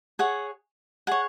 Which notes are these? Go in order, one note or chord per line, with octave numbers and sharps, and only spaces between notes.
G#4 C#5 F#5
G#4 C#5 F#5